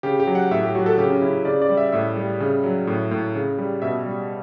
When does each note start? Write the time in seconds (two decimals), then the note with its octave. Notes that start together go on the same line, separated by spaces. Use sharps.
0.03 C#3 G4
0.20 G4
0.27 F#3
0.35 F#5
0.51 A2 E5
0.63 G4
0.75 F#3 F#4
0.86 A4
0.98 C#3 G4
1.10 C#4
1.22 C#3 E4
1.45 C#3 D5
1.62 D5
1.69 G3
1.77 E5
1.92 A2 E5
2.16 G3
2.40 C#3
2.64 F#3
2.87 A2
3.11 A2
3.35 C#3
3.58 G3
3.82 B2 E5
4.06 G3